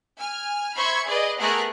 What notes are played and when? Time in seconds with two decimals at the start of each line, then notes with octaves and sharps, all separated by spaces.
0.20 G#5 F6
0.76 C5 E5 B5 C#6 G#6
1.07 G#4 B4 D5 D#5
1.39 A3 B3 G#4 A#4 A#5 F#6